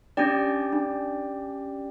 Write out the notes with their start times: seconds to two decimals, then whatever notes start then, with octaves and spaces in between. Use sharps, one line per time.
0.17 C#4 D4 G4 D5 G5
0.72 D4